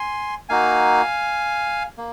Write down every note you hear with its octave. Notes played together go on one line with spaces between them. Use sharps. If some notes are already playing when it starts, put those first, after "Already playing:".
Already playing: G#5 C6
A#3 D#4 F#4 F5 G#5
A#3